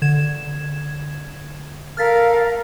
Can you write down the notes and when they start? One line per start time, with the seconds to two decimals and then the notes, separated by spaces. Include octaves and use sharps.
0.02 D3 G#6 E7
1.97 A4 A#4 F5 F6 A6 B6